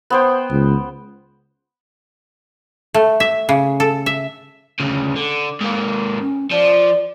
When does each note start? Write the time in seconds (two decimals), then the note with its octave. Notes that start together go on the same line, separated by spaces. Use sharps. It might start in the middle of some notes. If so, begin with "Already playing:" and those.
0.10 B3 C5 G5
0.51 C#2
2.94 A3
3.20 E5
3.49 C#3
3.80 A4
4.06 E5
4.80 D2 C#3
5.16 D3
5.61 G#2 A#3
6.20 C#4
6.51 F3 D5